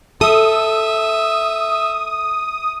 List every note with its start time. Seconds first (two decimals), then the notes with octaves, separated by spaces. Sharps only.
0.21 A4 E5 D#6